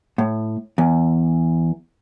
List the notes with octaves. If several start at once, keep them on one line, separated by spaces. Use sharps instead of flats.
A2
E2